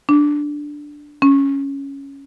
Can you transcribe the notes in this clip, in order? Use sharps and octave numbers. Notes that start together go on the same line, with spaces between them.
D4
C#4